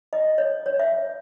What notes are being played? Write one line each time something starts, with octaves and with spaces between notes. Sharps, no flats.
D#5
C#5
C#5
E5